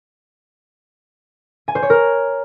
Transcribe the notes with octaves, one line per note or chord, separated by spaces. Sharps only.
G#5
C5
C#5
A#4